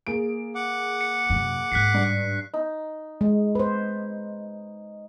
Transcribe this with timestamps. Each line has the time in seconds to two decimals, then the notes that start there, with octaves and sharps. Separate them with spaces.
0.07 A#3 G#4 D7
0.55 F#5 D6
1.01 C#7
1.30 F#2 C3
1.72 G#2 G#3 F#6 B6 C7
1.94 G2
2.54 D#4
3.21 G#3
3.55 B4 C5